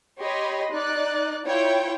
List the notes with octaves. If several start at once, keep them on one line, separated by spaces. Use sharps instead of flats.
G4 C#5 D#5 B5 C6
D#4 D5 F#6
E4 F4 C#5 G5